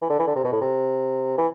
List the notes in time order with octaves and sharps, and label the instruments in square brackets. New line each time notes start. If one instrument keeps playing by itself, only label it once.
[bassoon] E3
D3
E3
D3
C3
B2
A2
C3
E3